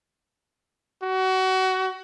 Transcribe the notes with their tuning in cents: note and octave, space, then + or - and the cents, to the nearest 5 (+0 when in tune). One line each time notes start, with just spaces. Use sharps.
F#4 +25